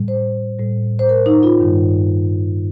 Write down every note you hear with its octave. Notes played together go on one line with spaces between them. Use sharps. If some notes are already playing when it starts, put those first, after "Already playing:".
Already playing: A2 G3
C5
A2 G3
C5
A#4
D#4
F4
G2 D#3 G3